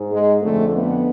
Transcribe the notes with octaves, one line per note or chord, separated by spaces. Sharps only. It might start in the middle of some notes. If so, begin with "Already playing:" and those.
Already playing: G#2
G#3
F2 D3 A3
B3